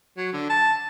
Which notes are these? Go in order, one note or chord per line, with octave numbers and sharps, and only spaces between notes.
F#3
D3
A5